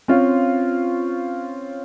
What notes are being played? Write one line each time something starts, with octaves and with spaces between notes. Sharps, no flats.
C4 C#4 F4